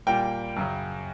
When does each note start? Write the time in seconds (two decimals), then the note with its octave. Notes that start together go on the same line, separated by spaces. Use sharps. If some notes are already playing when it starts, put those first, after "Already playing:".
0.07 A#2 G3 A#3 G5
0.56 F#2 C#3 F#3